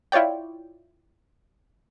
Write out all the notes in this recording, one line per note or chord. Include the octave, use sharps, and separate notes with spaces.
E4 F4 C#5 D5 G5